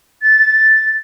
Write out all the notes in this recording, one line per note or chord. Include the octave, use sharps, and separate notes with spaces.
A6